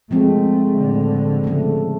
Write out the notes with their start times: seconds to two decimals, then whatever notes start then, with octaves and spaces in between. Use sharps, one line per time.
0.11 F3 G#3 A3 C4
0.77 A2 D3
1.44 C#3 F3 A3